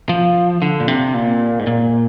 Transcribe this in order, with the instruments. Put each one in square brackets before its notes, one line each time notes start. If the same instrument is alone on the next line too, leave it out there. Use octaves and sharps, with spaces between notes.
[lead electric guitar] F3
D3
A#2
C3
A#2
G#2
A#2